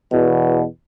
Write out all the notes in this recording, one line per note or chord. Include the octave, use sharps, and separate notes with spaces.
E2 B2